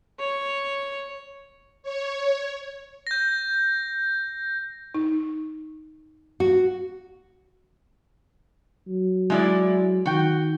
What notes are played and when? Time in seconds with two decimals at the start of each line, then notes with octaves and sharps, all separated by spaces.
0.19 C#5
1.83 C#5
3.07 G6 A#6
4.95 D#4
6.40 F#4
8.88 F#3
9.30 G#3 E4 D5
10.06 D#3 F#4 G5